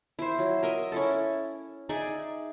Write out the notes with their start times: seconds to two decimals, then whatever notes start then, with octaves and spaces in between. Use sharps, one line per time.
0.19 E4 C5
0.39 F#3
0.63 A#4 D#5 E5
0.92 C#4 E4 A4
1.89 D#4 G#4 D5 E5